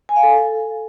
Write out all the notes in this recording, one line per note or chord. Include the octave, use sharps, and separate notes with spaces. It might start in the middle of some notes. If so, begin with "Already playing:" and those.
G#5
F5
A4